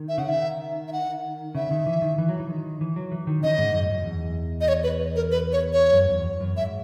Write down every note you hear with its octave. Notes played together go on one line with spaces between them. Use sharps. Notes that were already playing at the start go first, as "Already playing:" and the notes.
Already playing: D#3
E5
C#3 F#5
D#3 E5
E5
F#5
C#3 E5
D#3
E3
D#3
E3
F#3
E3
D#3
E3
F#3
E3
D#3
C#3 D#5
G#2
F#2
F#2
F#2
E2
D#5
C#5
B4
A#4
B4
C#5
C#5
F#2
E2
F#2
G#2 E5